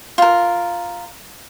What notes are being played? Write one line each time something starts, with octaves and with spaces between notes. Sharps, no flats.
F4 A#4